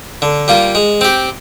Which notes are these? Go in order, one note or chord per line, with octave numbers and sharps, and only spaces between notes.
D3
G3 A#3 F4
G#3
C4 G4